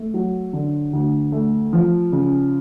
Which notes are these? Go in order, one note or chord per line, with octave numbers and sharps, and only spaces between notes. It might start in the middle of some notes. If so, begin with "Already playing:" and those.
Already playing: A3
F#3
D3
D2
A3
F3
C#3